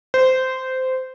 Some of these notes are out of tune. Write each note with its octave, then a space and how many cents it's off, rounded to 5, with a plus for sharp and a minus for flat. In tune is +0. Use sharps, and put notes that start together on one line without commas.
C5 -15